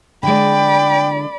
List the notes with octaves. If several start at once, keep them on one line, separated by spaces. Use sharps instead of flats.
D3 G#3 D5 G5 B5